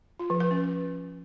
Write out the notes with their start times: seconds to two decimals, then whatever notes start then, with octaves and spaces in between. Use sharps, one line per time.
0.19 F4
0.30 F3
0.40 B4
0.51 C#4